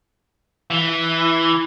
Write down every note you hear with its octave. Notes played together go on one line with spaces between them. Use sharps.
E3